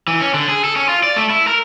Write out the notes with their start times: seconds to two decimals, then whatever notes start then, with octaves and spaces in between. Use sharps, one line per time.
0.08 E3
0.21 C#4
0.34 D3
0.49 G#4
0.64 A4
0.76 C#4
0.89 F4
1.04 D5
1.16 A3
1.30 E4
1.48 A#4